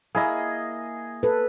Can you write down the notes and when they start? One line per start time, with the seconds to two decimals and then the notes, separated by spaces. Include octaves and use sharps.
0.15 A#3 E4 G#4 D#5
1.23 A4 B4